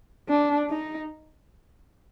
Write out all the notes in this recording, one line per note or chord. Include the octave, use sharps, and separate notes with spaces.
D4
D#4